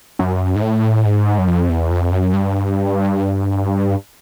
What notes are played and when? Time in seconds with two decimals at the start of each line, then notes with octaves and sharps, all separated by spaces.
0.19 F#2
0.55 G#2
0.62 A2
1.05 G#2
1.38 F#2
1.48 F2
1.69 E2
1.90 F2
2.12 F#2
2.33 G2